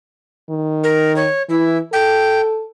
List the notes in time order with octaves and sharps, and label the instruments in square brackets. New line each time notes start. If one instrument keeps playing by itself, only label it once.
[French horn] D#3
[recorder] A#4
C#5
[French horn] E3 [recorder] E4
[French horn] A4 [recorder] G5